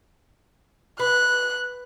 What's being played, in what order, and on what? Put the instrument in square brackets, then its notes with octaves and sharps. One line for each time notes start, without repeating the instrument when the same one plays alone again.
[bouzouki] B4 [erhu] F#6